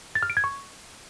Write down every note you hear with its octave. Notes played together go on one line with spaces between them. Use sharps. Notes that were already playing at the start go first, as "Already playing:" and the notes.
A6
F6
D7
G#6
C#6